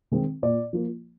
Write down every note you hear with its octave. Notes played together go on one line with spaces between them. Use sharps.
D#3 G#3 C4
A#2 D5
F3 A#3